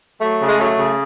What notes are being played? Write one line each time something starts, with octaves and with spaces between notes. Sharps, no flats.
F#3 A3
C#3
G#3
F#3 A3
C#3